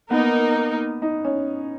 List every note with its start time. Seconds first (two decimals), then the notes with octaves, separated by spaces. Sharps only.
0.10 A#3 B3 D#4 A#4
1.02 D#4
1.25 C#4